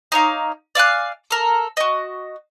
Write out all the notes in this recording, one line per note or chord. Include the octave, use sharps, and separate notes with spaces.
D#4 C#5 F5 D6
D5 F5 G#5 F#6
A4 A#4
F#4 D#5